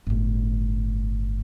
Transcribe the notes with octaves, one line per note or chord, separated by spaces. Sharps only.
G1 A2